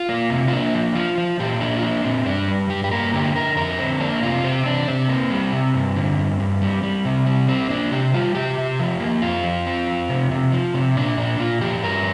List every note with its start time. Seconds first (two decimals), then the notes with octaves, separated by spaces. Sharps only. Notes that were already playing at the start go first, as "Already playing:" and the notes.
Already playing: F4
0.09 A#3
0.30 C3
0.48 F4
0.52 A#3 D4
0.74 F3
0.95 F3 F4
1.18 F3
1.39 A#2 G4
1.60 A#3 D4
1.77 F4
1.82 A#3 D4
2.04 A#2 C4
2.26 G2 D4
2.48 G3
2.70 G2 G4
2.84 G4
2.92 A#3 A#4
3.13 D3 G4
3.35 D3 A#4
3.57 F2 A#4
3.79 D3 C4
4.00 A#3 D4
4.23 C3 F4
4.44 C3 C4
4.65 C3 D4
4.88 C3 C4
5.09 A#3
5.30 G3
5.53 C3
5.74 G2
5.96 D3
6.17 G2
6.40 G2
6.61 G3
6.83 G3
7.05 C3
7.27 G3
7.48 G3 C4
7.70 A#3 D4
7.91 C3 G4
8.14 G3 F4
8.35 C3 G4
8.58 C3
8.80 F3
9.00 A#3
9.22 F2 F4
9.44 F3
9.67 C4
9.87 F2
10.10 C3
10.31 C3
10.52 F3
10.74 C3
10.97 A#2 D4
11.18 A#2 D4
11.39 A#2 F4
11.61 F3 G4
11.83 G2 A#4